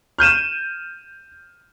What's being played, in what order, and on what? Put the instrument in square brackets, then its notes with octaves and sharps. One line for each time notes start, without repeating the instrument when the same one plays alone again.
[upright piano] F6 G6 D#7 E7